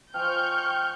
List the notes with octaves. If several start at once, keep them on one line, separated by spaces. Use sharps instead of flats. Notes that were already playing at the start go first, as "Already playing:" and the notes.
F3 D#5 G5 G#5 C#6 F6 G6